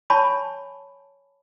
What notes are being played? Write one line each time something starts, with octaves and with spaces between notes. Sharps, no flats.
C#5 G#5 A5 B5 C#6